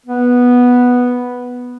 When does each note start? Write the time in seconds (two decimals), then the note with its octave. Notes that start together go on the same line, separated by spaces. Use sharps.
0.06 B3